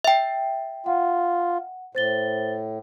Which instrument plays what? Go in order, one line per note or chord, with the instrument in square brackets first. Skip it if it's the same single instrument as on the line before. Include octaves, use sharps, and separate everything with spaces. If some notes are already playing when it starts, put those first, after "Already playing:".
[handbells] E5 G5
[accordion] F4 [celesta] F#5
[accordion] A2 [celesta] C5 A6 G7